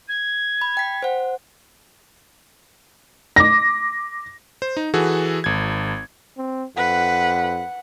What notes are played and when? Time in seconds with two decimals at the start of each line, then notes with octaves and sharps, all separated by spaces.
0.08 G#6
0.62 B5
0.77 G5 B6
1.02 C5 F#5
3.36 D6 A#6
4.62 C5
4.77 D#4
4.94 E3 F#4 G#4 A4
5.44 G#1 G#6
6.37 C4
6.77 F2 B4 F#5